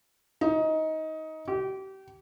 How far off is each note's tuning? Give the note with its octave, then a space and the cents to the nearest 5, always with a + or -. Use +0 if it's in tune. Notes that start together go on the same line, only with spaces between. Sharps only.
D#4 +20
G4 -30